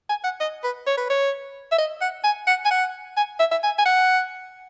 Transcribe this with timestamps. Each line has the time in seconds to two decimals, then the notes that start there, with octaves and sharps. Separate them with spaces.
0.09 G#5
0.24 F#5
0.40 D#5
0.64 B4
0.87 C#5
0.97 B4
1.10 C#5
1.72 E5
1.78 D#5
2.01 F#5
2.24 G#5
2.47 F#5
2.65 G#5
2.71 F#5
3.17 G#5
3.39 E5
3.51 E5
3.63 G#5
3.78 G#5
3.85 F#5